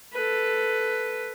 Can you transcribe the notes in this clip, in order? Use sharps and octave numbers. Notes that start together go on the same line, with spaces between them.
A4 B4